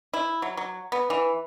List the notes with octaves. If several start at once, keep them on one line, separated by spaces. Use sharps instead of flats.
E4
F#3
F#3
B3
E3